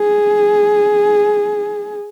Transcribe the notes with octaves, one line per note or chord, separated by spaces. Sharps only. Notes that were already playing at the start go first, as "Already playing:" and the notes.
Already playing: G#4